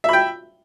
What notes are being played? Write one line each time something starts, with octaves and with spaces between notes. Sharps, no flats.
E5 G5 B5